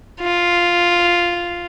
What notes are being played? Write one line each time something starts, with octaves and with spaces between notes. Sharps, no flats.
F4